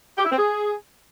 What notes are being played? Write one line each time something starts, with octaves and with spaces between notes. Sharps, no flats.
G4
E4
C4
G#4